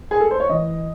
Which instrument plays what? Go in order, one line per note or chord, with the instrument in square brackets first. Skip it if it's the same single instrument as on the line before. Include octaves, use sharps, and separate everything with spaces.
[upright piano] G#4
A4
C5
C#5
E3 D#5